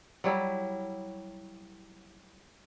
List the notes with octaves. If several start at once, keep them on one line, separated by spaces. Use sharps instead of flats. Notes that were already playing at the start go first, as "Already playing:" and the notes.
F#3 G3 E4